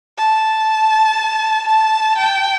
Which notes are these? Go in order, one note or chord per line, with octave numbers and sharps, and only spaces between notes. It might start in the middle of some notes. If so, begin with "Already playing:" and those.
A5
A5
G5